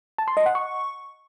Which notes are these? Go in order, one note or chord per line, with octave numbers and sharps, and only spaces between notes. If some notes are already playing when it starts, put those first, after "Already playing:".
A5
C6
D#5
F#5
C#6